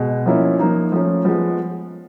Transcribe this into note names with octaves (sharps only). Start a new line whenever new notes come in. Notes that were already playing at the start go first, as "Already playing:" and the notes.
Already playing: B2 G#3
F3 A#3 C#4 E4
F3 A#3 D#4
F3 A3 C#4
F3 G#3 B3